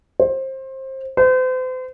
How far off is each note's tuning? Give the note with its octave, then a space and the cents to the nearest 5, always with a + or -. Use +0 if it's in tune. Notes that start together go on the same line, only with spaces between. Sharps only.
C5 +25
C5 -40